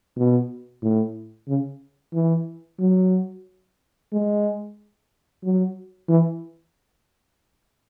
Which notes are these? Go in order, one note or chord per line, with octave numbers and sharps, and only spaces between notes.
B2
A2
C#3
E3
F#3
G#3
F#3
E3